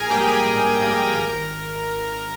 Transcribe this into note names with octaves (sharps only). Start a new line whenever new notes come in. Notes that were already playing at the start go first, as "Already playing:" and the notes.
Already playing: A#1 G#4 A#4 G#5 A#5
G#2 G3 A#3 G4 G5
G#4 G#5
A#1
G#2 G3 A#3
G#1 A#4 A#5